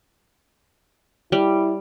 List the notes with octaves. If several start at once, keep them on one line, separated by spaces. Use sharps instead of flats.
G3 E4